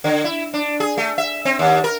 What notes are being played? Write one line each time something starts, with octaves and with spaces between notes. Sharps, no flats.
D3
E4
D4
G#4
A3
E5
C4
D#2
A#4